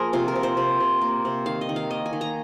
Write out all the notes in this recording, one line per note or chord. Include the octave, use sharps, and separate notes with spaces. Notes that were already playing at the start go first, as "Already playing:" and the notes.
Already playing: F3 A#3 G#4 A#4
C3 F4
A#4
C3
C5
C3
C3
A#3
C3
D#3 F5
D#5
D#3
F5
A#3 D#5
G#5
D#3
A#5